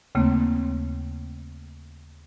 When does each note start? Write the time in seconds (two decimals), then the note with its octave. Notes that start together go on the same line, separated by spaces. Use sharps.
0.15 D#2 C#3 A3 A#3 C4